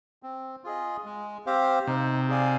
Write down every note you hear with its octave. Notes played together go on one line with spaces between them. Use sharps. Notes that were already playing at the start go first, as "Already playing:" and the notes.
C4
F4 G#4 D#5
G#3
C4 G4 C5 F5
C3 D#4
G#4 D5 F5 G#5